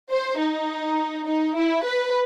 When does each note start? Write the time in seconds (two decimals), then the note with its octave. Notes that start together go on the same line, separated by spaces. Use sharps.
0.12 C5
0.39 D#4
1.27 D#4
1.57 E4
1.85 B4